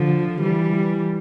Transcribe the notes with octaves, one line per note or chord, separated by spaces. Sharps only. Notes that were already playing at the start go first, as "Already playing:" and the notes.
Already playing: D3 F3
E3 G3